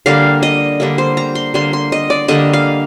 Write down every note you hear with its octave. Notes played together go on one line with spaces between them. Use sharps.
D3 G3 A#3 F5
D#5
D3 G3 A#3
C5
A#5
C6
D3 G3 A#3 C6
C6
D#5
D5
D3 G3 A#3 D#5
F5